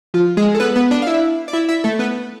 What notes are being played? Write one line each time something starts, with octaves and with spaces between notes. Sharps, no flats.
F3 F4
G#3 G#4
A4
B3 B4
B3 B4
D4 D5
F5
E4 E5
D5
E4 E5
E4 E5
A3 A4
B3 B4